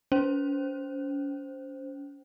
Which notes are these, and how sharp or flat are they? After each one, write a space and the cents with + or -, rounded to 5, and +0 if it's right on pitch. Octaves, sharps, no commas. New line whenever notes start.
C#4 +35 C5 +0